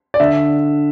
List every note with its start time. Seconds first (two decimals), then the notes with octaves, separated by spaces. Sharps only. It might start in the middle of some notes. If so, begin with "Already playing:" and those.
0.14 D5
0.20 D3 E5